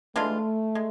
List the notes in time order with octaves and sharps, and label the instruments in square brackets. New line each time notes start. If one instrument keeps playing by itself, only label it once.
[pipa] E3 G#3 D4 F4 [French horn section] A3
[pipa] G#3